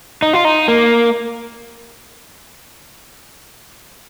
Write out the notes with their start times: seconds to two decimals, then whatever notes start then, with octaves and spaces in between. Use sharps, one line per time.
0.22 D#4
0.33 F4
0.45 D#4
0.68 A#3